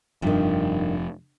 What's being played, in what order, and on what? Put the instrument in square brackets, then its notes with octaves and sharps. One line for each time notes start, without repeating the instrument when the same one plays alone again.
[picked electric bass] F1 F3 [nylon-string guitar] G2 D#3